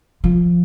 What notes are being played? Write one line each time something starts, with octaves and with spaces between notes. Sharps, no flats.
F3